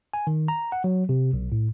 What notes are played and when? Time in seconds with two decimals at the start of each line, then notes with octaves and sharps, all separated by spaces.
0.14 G#5
0.27 D#3
0.48 A#5
0.72 F#5
0.84 F#3
1.09 C3
1.33 B1
1.52 A2